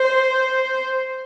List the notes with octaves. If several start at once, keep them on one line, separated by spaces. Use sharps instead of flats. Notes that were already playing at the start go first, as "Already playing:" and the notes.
Already playing: C5